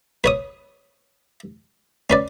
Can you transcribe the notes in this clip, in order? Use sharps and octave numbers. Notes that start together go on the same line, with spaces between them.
B4 C#5 D#6
C#4 B4 D5